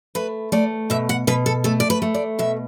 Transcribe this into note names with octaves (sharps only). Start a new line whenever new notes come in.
A3 B4
A3 D5
B2 E5
F#5
B2 B4
A4
A3 A4
D5
B4
A3
D5
B2 E5